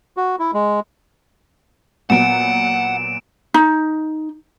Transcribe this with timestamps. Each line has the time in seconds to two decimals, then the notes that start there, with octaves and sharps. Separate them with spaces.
0.17 F#4
0.39 E4
0.54 G#3
2.10 A#2 F#3 B3 F#5 D7 E7
3.54 D#4